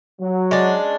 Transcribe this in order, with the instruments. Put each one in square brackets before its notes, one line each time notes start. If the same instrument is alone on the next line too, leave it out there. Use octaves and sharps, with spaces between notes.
[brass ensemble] F#3
[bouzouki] G#3 C#4 D4